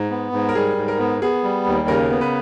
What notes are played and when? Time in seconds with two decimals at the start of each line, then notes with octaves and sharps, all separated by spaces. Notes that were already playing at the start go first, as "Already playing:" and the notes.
Already playing: G#2
0.11 B3
0.33 G#2
0.49 A#4
0.55 G3 G#4
0.77 G#2
0.88 A#4
0.99 B3
1.22 B3 G#4
1.44 G3
1.66 D#2
1.88 C#3 A#4
2.10 B3
2.21 B4